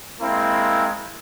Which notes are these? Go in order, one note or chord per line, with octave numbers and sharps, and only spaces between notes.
G#3 A#3 C4 E4